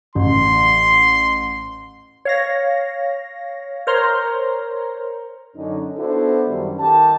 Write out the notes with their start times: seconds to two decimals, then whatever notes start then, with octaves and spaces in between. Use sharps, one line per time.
0.15 A1 C6
2.25 C#5 F5 A#6
3.87 A#4 C5 C#5 A#5 C6
5.56 F#2 D3 C#4 D#4
5.97 B3 D4 E4 F#4 A4 C5
6.49 F#2 D#3 G3
6.78 D#3 G4 A4 A5